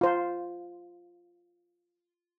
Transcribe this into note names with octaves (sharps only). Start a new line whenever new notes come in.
F4 C5